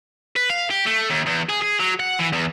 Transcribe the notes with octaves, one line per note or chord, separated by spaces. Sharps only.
B4
F5
G4
A3
D#2
E2
G#4
G#4
F#3
F#5
E3
E2